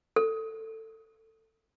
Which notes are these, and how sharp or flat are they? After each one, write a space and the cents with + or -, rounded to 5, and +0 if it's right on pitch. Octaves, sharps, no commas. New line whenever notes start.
A4 +15